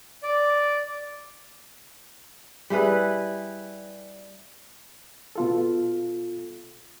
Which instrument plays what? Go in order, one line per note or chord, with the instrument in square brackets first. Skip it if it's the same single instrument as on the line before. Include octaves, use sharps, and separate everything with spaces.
[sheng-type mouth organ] D5
[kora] G3 E4 G#4 B4
[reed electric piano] B2 F4 A4